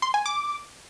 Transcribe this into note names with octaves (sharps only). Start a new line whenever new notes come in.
C6
G#5
D6